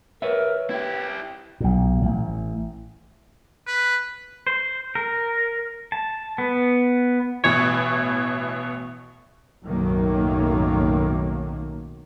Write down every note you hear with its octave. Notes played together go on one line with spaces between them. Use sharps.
A#4 B4 C#5 E5
E4 G4 G5
B1 A#2
A1
B4
C5
A#4
A5
B3
A1 B2 E3 C#5
B1 F#2 A2 D#3 F#3 A#3